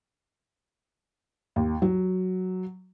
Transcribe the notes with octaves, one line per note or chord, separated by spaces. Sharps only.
D#2
F#3